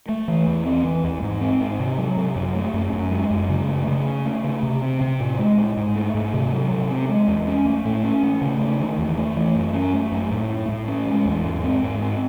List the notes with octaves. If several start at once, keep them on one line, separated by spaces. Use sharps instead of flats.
A3
E3
E2
C4
E3
E2
G#2
C4
G#2
C3
F#3
C3
F#2
A3
F#2
F#2
G#3
F#2
C#3
A3
C#3
C#4
A3
C#3
C3
C4
C3
A2
G#3
A2
G#2
A3
G#2
C3
F#3
C3
C4
G#3
E2
C#4
A3
A2
C#4
A3
C#3
A3
D#3
E2
A3
E3
F#2
C#4
A3
F#2
A2
A3
A2
C#4
G#3
E2
G#2
C4
G#2
C4